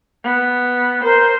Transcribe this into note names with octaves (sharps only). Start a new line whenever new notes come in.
B3
A#4 C5